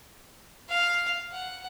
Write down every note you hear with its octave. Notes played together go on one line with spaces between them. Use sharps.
F5
F#5